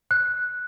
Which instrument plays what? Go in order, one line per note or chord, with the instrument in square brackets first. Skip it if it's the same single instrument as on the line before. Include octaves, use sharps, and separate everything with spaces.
[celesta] F#6